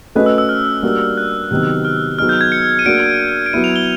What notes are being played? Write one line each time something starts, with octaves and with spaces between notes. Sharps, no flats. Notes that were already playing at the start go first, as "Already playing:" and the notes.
A3 C#4 F#4 B4 D#5 F#6
E6
E6
F6
G3 A#3 D4 F#4
F#6
C3 D#3 F#3 B3 D#4
F6
F#3 B3 D#4 G#4 F6
G6
G#6
C#7
D#7
A#3 D4 F#4 D7
D7
F#3 B3 E4 D#7
F7
G7